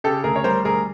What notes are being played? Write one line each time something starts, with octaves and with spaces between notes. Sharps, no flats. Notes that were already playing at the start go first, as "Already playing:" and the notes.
C#3 G4 A4
D2 G#4 A#4
C#5
G3 A#4 C5
D2 G#4 A#4